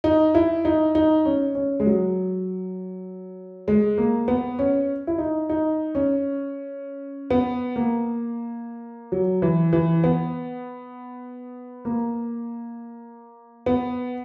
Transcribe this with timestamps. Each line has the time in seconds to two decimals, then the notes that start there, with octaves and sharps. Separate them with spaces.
0.04 D#4
0.35 E4
0.65 D#4
0.95 D#4
1.26 C#4
1.55 C#4
1.80 G#3
1.86 F#3
3.68 G#3
3.98 A#3
4.28 B3
4.59 C#4
5.07 E4
5.18 D#4
5.49 D#4
5.95 C#4
7.30 B3
7.76 A#3
9.12 F#3
9.42 E3
9.73 E3
10.04 B3
11.85 A#3
13.66 B3